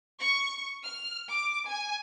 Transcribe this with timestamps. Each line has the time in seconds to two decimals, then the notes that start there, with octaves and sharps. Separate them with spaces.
0.18 C#6
0.85 F6
1.29 D6
1.67 G#5